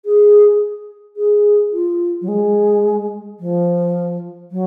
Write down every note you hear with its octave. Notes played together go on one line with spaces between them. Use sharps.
G#4
G#4
F4
F#3
G#3
F3
F#3